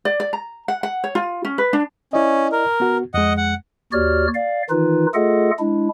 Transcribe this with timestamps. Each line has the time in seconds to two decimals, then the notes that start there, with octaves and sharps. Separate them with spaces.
0.05 D5
0.20 D5
0.33 A#5
0.68 F#5
0.83 F#5
1.04 C#5
1.15 F4
1.45 C#4
1.58 B4
1.73 D4
2.13 C#4 E4 D5 D#5
2.52 A#4
2.80 B3 F#4
3.14 F2 G#3 D#5 F#5
3.37 F#5
3.92 D#2 F#4 G4 C#5 D5 F6
4.34 D5 F5
4.70 D#3 E3 D#4 F4 B4
5.14 A3 F4 G#4 A4 D#5 F#5
5.59 G#3 D4 E4